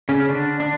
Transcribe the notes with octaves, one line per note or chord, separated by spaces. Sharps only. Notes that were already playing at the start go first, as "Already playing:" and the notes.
C#3 C#4
C#4
D3 D4
D4